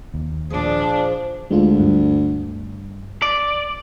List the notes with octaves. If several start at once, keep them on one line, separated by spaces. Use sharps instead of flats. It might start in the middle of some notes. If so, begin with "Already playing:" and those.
D#2
A#2 F3 D4 G#4 D5
D2 G#3 F4
G2
D5